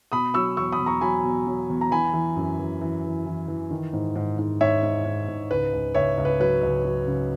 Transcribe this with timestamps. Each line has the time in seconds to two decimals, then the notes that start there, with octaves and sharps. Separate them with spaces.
0.12 B2 B5 D#6
0.34 F#3 C#6 E6
0.57 E2 C#6 E6
0.72 B5 D#6
0.79 E2
0.86 A#5 C#6
1.01 F#3 G#5 B5
1.24 B2
1.47 F#3
1.70 E2
1.81 A#5
1.91 E3 G#5 B5
2.14 E3
2.36 F#2
2.59 E3
2.81 E3
3.04 E3
3.26 E3
3.48 E3
3.71 D#3
3.93 G#2
4.16 G#2
4.39 G#2
4.61 G#2 C#5 E5
4.83 G#2
5.05 G#2
5.28 G#2
5.51 C#2 B4
5.73 C#2
5.95 C#2 C#5 E5
6.18 C#2
6.25 B4
6.40 F#3 B4
6.63 C#2
6.85 F#3
7.07 C#3